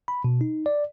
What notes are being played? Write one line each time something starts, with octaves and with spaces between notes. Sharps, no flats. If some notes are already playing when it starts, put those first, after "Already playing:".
B5
B2
D#4
D5